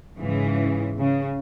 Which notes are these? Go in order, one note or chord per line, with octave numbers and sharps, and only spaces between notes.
G#2 C#3 E3
C#3